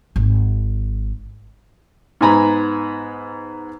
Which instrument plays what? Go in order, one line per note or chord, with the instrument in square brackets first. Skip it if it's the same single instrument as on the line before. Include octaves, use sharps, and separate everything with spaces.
[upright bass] G#1
[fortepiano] G#2 B3 G#5 A#5 B5